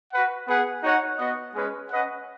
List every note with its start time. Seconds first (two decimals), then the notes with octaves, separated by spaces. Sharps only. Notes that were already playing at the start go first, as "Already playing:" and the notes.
0.12 F#4 B4 F#5
0.48 B3 G#4 B4 F#5
0.83 D#4 F#4 C#5 F#5
1.19 B3 F#4 D#5
1.54 G#3 C#4 G#4 B4
1.90 C#4 B4 D#5 F#5